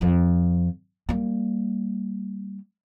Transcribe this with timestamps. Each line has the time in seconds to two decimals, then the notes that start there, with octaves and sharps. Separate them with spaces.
0.01 F2 F3
1.09 G3 A#3